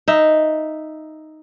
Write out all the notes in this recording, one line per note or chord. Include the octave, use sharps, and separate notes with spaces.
D#4 E5